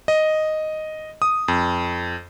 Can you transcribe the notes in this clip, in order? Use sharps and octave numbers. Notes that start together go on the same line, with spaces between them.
D#5
D#6
F2